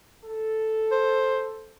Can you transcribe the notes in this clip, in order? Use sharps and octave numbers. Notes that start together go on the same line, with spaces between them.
A4
C5